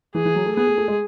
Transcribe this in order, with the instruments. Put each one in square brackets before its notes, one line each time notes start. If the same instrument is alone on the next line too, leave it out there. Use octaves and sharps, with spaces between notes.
[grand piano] E3 [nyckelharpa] G#4
[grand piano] E3
F#3
A3
[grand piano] B3 [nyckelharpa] G#4
[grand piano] A3
A3
G#3